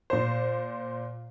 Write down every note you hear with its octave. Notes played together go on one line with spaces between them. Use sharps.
A#2 C5